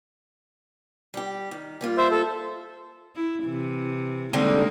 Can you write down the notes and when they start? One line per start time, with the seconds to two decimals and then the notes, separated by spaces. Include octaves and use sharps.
1.14 G3 G4
1.51 D#3
1.81 G3 A#3 F4
1.97 C5 E5
2.11 A4
3.16 E4
3.45 C3 E3
4.33 D3 G3 G#3 A#3 C4 D#4